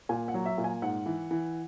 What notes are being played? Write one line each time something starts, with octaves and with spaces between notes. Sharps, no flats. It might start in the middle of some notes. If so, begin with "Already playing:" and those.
A#2 G#5
F#5
F#3
E5
A#2
G#5
G#2 F#5
E3
E3